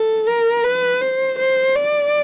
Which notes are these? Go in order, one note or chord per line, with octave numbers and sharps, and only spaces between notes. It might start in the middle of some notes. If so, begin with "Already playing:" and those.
Already playing: A4
A#4
B4
C5
C5
D5